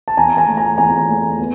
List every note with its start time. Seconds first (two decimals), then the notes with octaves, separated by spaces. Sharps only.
0.08 A5
0.17 E2 G#5 A#5
0.37 G#5 A#5
0.47 A3
0.57 G#5 A#5
0.78 E2 G#5 A#5
1.09 A3
1.39 B3